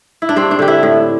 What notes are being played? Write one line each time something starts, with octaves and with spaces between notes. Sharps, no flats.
E4
D4
G2 C4
D4
D3 G4
E4
A2